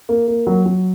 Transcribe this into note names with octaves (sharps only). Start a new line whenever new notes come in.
A#3
A#3
F#3
F#3